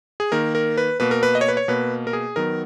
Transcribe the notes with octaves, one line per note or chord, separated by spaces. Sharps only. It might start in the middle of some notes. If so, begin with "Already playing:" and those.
G#4
D#3 A#3 A#4
A#4
B4
B2 A#3 B4
A#4
B4
D#5
C#5
B4
C#5
B2 A#3 B4
A#4
G#4
D#3 F#3 B3 A#4